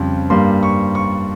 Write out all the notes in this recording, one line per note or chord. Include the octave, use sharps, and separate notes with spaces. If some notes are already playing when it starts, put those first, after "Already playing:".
Already playing: F2 C#3 G3
G2 G3 A#3 C6
C#6
C#6